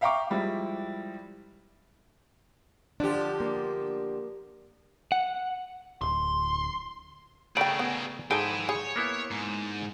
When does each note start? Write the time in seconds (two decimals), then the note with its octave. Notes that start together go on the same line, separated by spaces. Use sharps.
0.01 E5 F5 G5 A#5 C#6 D6
0.30 F3 G3 G#3 E4
3.00 D3 F3 D4 G4
3.40 A#3
5.12 F#5
6.02 D1 C6
7.57 C#3 A3 G#4 A#4 D5 G5 B5
7.79 B3
8.31 G#2 D#4 G#4 A4 B4 G5 G#5
8.69 G#4 C#5
8.96 A#3 B3 E4
9.31 G#2